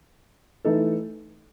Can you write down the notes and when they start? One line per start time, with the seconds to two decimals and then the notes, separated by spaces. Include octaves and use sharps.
0.65 E3 A3 D#4 A4